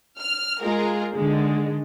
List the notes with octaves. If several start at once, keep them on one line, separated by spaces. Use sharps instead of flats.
F6
G#3 F4 G#4 A#4
D3 D#3 G#3